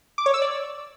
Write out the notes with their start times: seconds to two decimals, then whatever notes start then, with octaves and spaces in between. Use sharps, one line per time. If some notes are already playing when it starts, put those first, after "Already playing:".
0.18 D6
0.26 C#5
0.34 E6
0.42 D5